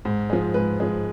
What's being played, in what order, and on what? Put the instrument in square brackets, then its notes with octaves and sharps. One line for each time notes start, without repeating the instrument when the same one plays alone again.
[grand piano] G#2
F3 G#3
G#2 B4
F3 G#3